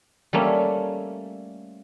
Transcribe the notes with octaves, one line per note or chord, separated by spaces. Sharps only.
G3 A3 A#3 C#4